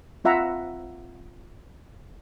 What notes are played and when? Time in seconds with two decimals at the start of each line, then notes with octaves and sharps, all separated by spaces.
0.24 C4 F4 E5 F#5 A#5 B5